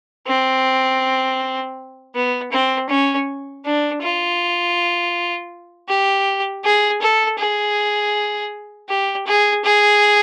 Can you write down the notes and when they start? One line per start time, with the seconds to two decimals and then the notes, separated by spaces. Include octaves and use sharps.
0.27 C4
2.15 B3
2.52 C4
2.89 C#4
3.65 D4
4.02 F4
5.89 G4
6.64 G#4
7.01 A4
7.39 G#4
8.89 G4
9.26 G#4
9.64 G#4